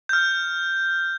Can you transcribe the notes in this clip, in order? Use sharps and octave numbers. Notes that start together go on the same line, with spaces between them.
F6 G6